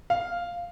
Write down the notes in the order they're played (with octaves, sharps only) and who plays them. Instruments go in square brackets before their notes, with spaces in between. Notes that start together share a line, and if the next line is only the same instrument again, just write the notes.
[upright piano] F5